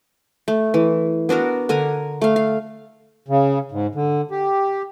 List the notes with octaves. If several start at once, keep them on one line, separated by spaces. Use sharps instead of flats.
A3
E3
B3 D4 F#4 A#4
D3 A#4 G#5 A#5
A3 F5
F5
C#3
G#2
D3
G4